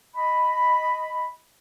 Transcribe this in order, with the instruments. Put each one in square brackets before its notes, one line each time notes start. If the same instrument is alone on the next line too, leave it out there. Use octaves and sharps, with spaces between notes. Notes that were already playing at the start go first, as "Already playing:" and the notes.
[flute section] D#5 B5